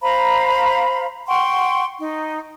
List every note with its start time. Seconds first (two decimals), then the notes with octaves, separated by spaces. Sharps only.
0.02 C5 F5 A#5 B5
1.27 F#5 G5 C6 C#6
1.99 D#4